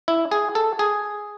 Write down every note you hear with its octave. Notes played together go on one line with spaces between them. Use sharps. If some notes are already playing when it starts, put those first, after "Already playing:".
E4
G#4
A4
G#4